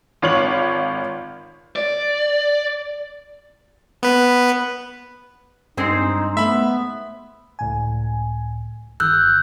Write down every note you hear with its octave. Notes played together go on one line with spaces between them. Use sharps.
G#1 F4 C#5 F#7
D5
B3 B4
G2 G#3 C4 D#4 C5
A3 B3 E5 B5
C#2 A2 G#5
G1 D#3 E6 F#6 G6